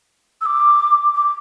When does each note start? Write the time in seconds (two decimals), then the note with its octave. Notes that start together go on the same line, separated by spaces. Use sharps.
0.41 E6
0.46 D6
1.15 D6